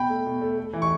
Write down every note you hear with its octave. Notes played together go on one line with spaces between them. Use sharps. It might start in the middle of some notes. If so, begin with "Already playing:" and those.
Already playing: B2 G5 B5
A3
B2
A3
A3
E3
C#6